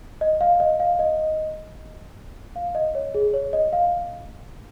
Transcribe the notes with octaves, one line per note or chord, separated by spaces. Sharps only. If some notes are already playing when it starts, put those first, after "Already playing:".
D#5
F5
D#5
F5
D#5
F5
D#5
C#5
G#4
C#5
D#5
F5